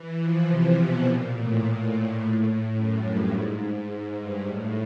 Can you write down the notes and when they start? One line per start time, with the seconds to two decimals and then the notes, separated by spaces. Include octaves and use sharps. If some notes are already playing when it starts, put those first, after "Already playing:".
Already playing: E3
0.21 F3
0.48 C3
0.76 B2
1.05 A#2
1.34 A2
2.76 F#2
3.04 G2
3.33 G#2
3.90 G#2
4.17 G2
4.47 A2